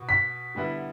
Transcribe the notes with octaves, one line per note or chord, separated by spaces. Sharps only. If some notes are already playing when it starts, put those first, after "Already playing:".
Already playing: B2 F#4
B6
D3 G3 B3 E4 B4